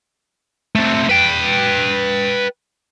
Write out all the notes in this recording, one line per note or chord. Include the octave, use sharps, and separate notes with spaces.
A3 C4
B4 G5